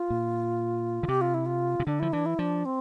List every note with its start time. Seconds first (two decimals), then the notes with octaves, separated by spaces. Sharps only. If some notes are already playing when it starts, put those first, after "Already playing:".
Already playing: F4
0.10 A#2
1.03 D3
1.08 C3 G4
1.21 F4
1.34 E4
1.46 F4
1.80 C3
1.86 D3 D4
2.00 F3 E4
2.13 E3 D4
2.26 E4
2.39 F3 D4
2.65 C4